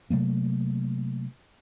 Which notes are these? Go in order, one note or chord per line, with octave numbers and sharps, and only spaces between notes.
C3 F#3 A3 A#3